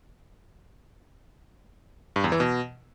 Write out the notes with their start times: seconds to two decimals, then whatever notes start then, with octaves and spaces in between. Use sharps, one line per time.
2.16 G2
2.24 E2
2.32 E3
2.40 B2